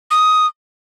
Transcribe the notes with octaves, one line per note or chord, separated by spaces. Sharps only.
D#6